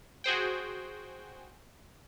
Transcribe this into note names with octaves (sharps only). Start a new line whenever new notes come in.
F#4 G#4 C5 G5